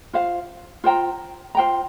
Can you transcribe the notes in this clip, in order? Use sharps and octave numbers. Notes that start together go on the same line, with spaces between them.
F4 C5 F5
F4 C5 G5 A#5
F4 C5 G5 A#5